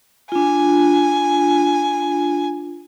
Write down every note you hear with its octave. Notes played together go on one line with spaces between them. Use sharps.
D4 F4 G#5